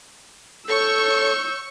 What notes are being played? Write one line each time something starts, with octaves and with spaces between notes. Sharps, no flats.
A4 C#5 C#6 E6 G6